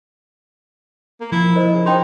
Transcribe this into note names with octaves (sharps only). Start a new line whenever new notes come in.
A#3
F3 E4
A#4 C5 D#5
C#3
D#4 C5 G5 C6